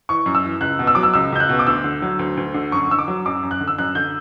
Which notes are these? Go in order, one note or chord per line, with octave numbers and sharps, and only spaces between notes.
E3 C#6
F#2
E6
E3
C#2 F#6
B2
E6
F#3 D6
E6
C#2 E6
C#2 G6
F#6
B2
D6
D2 E6
D3
F#3
D2
D2
D3
F#2 C#6
D3 E6
D6
F#3
F#2 D6
F#2
F#6
D3
E6
F#2 F#6
D3 G6